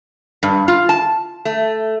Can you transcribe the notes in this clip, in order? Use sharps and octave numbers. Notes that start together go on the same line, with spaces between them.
G2
F4
A5
A3